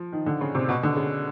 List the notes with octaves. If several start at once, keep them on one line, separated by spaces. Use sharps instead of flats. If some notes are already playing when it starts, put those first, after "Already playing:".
Already playing: F3
D#3
D3
C#3
C3
B2
D3
C#3